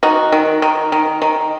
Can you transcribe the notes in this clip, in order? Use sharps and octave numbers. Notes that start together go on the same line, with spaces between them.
D#3 D#4 F#4
D#3
D#3
D#3
D#3